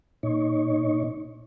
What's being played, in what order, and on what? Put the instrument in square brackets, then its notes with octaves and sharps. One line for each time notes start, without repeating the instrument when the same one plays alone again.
[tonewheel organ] A#2 D#4 C#5